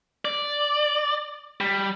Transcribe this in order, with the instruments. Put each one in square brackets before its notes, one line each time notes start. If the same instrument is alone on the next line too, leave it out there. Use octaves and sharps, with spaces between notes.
[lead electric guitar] D5
G3